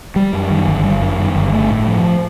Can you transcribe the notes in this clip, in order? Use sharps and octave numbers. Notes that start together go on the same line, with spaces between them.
G3
F#2
D#3
G1
G3
F#2
D#3
G1
A3
A2
F3